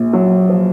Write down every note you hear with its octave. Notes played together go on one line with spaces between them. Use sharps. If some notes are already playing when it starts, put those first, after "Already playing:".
Already playing: A#1
F#3
F3